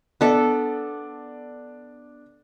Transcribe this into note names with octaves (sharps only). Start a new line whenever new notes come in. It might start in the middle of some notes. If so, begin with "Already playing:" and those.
B3 D4 A4 D5